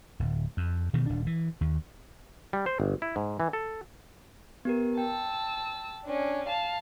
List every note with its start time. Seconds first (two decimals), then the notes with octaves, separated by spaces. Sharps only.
0.20 D1
0.57 F2
0.93 B2 D#3 E3
1.06 D#1 D4
1.27 E3
1.61 D#2
2.53 G3
2.66 C5
2.80 G1
3.02 E4
3.16 G#2
3.40 E3
3.53 A4
4.65 B3 G4 A#4
4.98 G5 A5 E6
6.05 C#4 D4
6.48 F5 A5